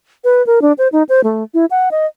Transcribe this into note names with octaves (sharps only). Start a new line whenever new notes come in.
B4
A#4
D4
C5
D#4
C5
A3
E4
F#5
D#5